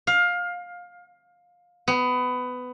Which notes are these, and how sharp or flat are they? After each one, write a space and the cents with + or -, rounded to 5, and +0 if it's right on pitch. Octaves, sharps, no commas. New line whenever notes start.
F5 +20
B3 +20